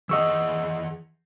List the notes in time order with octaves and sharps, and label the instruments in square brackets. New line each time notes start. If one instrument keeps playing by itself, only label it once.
[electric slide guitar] E3 G#4 F#5 [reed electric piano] D#5 C#6 E6